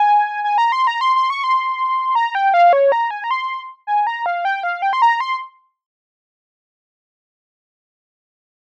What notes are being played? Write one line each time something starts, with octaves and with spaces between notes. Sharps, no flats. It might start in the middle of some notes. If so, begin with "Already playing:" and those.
Already playing: G#5
G#5
A#5
C6
A#5
C6
C6
C#6
C6
A#5
G5
F5
C#5
A#5
G#5
A#5
C6
G#5
A#5
F5
G5
F5
G5
C6
A#5
C6